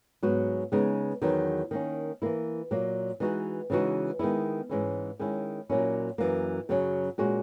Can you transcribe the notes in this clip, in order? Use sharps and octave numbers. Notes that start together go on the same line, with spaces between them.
G#2 F#3 B3 F#4
C#3 G#3 B3 D#4
E2 D#3 F#3 B3 D#4
D#3 A#3 C#4
E3 A#3 E4
A#2 F#3 A#3
E3 G#3 D#4 F#4
C#3 E3 G#3 D#4 F#4
D#3 G#3 B3 E4
G#2 E3 G#3 C#4 E4
D#3 G#3 C#4 E4
A#2 F#3 A#3 C#4 E4
F#2 E3 A#3
F#2 C#3 F#3 C#4
A#2 G#3 C#4 F#4